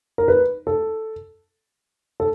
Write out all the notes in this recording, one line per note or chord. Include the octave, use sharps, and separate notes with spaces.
A#4
B4
A4
A4